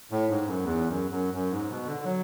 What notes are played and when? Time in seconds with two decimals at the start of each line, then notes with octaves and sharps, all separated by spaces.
0.11 A2
0.29 G#2
0.46 F#2
0.64 E2
0.88 F#2
1.11 F#2
1.34 F#2
1.51 G#2
1.69 B2
1.86 D3
2.04 F#3